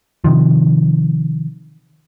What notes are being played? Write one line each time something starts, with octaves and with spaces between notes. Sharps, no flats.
C3 D#3 F3